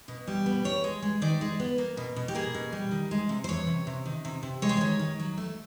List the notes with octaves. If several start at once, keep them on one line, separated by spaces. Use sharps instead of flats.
B2
G3
B3
B3 C#5
G#3
G#3
D#3 D5
G#3
B3
A#3
B2
B2
G4
A#3 G#4
B2
G3
D#3
G#3
C3
C5
E2 C#5
C3
C3
D#3
C3
C3
G#3 C#5
C5
D#3 C#5
D#3
F#3
A3